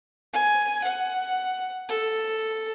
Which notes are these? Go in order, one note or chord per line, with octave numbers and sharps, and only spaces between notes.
G#5
F#5
A4